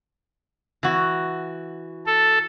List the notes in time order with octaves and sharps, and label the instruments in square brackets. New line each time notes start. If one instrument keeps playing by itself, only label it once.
[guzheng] E3 F#4
[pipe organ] A4